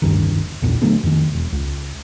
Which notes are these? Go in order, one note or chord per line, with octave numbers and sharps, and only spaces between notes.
F1 D2 G2 D#3
A#1 E2 A#2 D3
D3 F#3 A3 B3
F2 D#3
E1
C#2